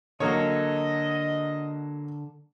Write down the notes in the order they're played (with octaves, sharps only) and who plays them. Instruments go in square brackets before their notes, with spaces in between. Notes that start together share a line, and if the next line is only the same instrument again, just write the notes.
[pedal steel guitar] D3 A4 [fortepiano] F#3 A#3 C#5 [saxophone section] D#5